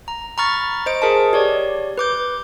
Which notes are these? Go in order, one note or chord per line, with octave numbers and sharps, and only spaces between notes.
A#5
A#5 B5 C#6 F6 A6
C5 D#5 D7
G#4 A#4 D#5 A5
G4 C#5 D5
B4 D6 G6